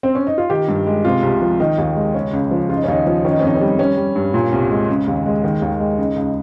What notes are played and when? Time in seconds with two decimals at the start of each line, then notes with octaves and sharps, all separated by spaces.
0.03 C4
0.15 C#4
0.27 D#4
0.38 F4
0.50 D#3 G4
0.68 G2
0.87 G#3
1.05 C3 F4
1.23 C2
1.41 F3
1.60 D#3 D#4
1.78 D#2
1.96 G#3
2.14 C#3 C#4
2.33 C#2
2.51 F3
2.69 C#3 F4
2.76 D#4
2.84 C#4
2.88 D#2 D#4
3.07 F3
3.25 D#3 C#4
3.31 D#4
3.39 C#4
3.43 F2 D#4
3.55 C#4
3.61 G3
3.79 G3 C#4
3.97 G3
4.16 G2
4.34 A#2
4.52 C2
4.71 G#3
4.89 C#3
5.08 D#2
5.26 G#3
5.44 D#3
5.62 D#2
5.80 G#3
5.98 C#3 D#4
6.16 C#2